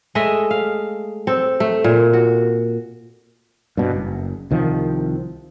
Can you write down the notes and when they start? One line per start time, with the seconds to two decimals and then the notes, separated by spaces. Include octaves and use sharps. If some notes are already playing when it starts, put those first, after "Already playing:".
0.15 G#3 A3 D#5 E5
0.51 F5
1.27 C4 A4
1.60 A3
1.84 A#2
2.13 F#4
3.77 G2 B2
3.91 F#1
4.50 C2 D#3 F3